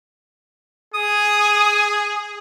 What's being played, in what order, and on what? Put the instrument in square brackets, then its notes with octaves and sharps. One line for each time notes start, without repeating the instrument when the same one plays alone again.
[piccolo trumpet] G#4 [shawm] D#6